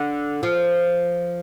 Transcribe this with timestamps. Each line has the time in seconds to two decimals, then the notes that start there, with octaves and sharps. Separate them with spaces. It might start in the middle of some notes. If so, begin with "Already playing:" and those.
Already playing: D3
0.43 F3